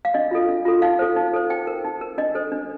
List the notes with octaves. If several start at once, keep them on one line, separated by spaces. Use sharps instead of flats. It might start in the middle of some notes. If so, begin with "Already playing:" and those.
F5
D4 D#5
F4 A4
D4
F4 A4
D#4 F5
A4 C5
D#4
A4 C5
D#4 G5
A#4
D#4
A#4
D4 D#5
A4 C5
D4